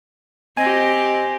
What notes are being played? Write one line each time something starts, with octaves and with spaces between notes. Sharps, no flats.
C4 G4 D#5 G#5